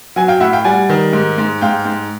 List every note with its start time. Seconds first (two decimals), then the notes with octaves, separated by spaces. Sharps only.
0.16 F#3 F#5 G#5
0.28 F5 G5
0.40 A2 E5 F#5
0.53 F5 G5
0.65 G3 F#5 G#5
0.89 D#3
1.13 G#2
1.38 G#2
1.61 G#2 F5 G5
1.86 G#2